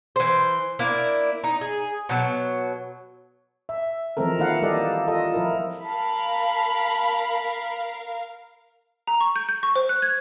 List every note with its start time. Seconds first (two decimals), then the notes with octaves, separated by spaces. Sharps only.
0.16 E3 C5
0.79 A#3 D4 E4
1.44 D#4
1.61 G#4
2.09 B2 F#3
3.69 E5
4.17 E3 F3 G#3 C4 A4 A#4
4.39 D#3 A#3 E4 A4 F5 F#5
4.62 G3 A#3 G4 A4 D5 D#5
5.07 F4 A4 D#5
5.34 F3 E4 A#4
5.85 A#4 F5 A5 B5
9.07 A#5
9.21 C#6
9.36 G6
9.49 G6
9.63 C#6
9.76 C5
9.89 F#6
10.02 G#6